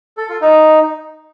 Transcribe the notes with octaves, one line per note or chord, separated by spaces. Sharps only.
A4
F4
D#4